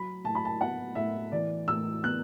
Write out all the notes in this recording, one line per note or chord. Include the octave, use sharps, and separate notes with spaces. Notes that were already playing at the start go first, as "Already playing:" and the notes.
Already playing: F#3 B5
A2 A5
B5
A5
B3 F#5
A2 E5
E3 D5
A2 E6
B3 F#6